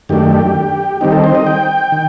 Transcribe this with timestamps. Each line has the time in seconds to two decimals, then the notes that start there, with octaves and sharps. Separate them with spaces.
0.09 F#2 D#3 A3 D4 G4
1.01 D#3 G3 C4 D#4 G4
1.12 A4
1.24 C5
1.35 D#5
1.47 G5
1.92 D#3